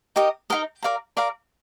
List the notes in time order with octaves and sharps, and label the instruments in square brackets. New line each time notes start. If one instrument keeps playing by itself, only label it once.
[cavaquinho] D#4 G4 A#4 D#5
D#4 G4 A#4 D#5
A#4 D5 F5 A#5
A#4 D5 F5 A#5